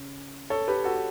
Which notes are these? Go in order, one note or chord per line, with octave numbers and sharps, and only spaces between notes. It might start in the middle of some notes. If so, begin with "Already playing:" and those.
Already playing: C#3 C#4
A4 C#5
G4 B4
F#4 A4